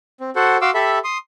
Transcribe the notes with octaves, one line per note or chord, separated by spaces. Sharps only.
C4
F#4 A4 C5 F#5
F#4 F5 C6 D6 E6
G4 A4 E5 B5
C6 D#6